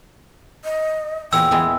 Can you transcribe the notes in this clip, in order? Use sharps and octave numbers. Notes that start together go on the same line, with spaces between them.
D#5
E2 A#2 G5 E6
E3 G#3 B3